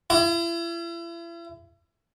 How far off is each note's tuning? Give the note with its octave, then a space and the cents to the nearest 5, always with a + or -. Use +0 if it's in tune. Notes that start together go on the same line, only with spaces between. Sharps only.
E4 +40